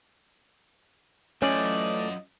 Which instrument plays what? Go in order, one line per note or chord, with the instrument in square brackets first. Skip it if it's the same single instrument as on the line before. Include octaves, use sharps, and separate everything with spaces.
[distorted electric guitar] F#2 [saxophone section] E3 F4 D#5 [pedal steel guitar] A3 D5 [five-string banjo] C#4